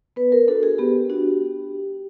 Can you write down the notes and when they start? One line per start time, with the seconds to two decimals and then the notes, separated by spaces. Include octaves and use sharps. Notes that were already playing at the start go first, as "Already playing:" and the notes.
0.16 B3 B4
0.32 A#4
0.48 D4 F#4 A4
0.63 G#4
0.78 B3 G4
1.10 D4 F#4